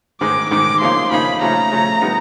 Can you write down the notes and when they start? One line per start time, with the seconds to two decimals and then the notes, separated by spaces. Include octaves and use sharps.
0.21 G#2 D#3 G#3 D6
0.50 G#2 D#3 G#3 D6
0.81 C#3 F3 A#3 D#4 C6
1.11 C#3 F3 A#3 D#4 B5
1.41 C#3 F3 A3 A#5
1.72 C#3 F3 A3
2.02 A#2 G3 B3 D#4